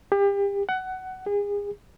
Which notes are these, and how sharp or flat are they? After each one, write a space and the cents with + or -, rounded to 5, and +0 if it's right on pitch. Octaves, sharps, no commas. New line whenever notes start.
G4 +35
F#5 +20
G#4 -35